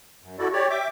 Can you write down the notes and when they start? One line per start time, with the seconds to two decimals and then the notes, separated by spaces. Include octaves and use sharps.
0.22 F#2
0.38 E4 F#4 A4 D5
0.52 G4 C#5 D5
0.70 E5 G5 D6